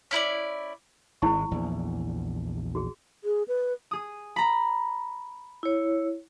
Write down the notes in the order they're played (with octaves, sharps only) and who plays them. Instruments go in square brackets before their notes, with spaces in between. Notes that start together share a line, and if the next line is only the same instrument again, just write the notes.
[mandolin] C#4 E4 B4 D5
[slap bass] G#1 G#3 [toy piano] E4 A5 C#6
[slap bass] A#1 E2
[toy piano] F#4 G#4
[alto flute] G#4
B4
[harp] G#4 D#6
A#5 B5
[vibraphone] E4 C#5